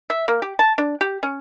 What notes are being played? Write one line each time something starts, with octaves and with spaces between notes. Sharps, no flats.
E5
A#3
G4
A5
D4
G4
C#4